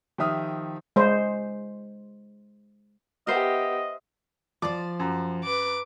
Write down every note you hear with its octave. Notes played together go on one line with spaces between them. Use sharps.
D#3 F3 G4 E5 D#6 F6
G#3 C5
B3 G4 A#4 C5 D#5 E5
F3 C5 D5 D6
F#2
B4 D6